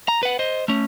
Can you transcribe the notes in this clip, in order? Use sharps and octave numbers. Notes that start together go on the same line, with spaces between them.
A#5
B4 F#5
C5 D#5
A3 C#4